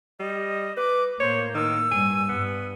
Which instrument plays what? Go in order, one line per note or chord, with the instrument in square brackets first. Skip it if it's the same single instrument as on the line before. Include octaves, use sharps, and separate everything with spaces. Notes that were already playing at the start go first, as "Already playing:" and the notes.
[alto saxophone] G3 [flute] D#5
[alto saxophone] B4 [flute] D6
[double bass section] A2 A#3 [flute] C5 [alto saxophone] C#5
[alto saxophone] D#3 [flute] E6
[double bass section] G2 [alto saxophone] G#5
[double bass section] G2 [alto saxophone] B3